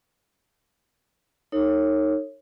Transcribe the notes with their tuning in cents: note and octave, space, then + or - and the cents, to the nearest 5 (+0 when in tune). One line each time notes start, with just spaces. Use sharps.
D#4 +0 A4 +45 C#5 -15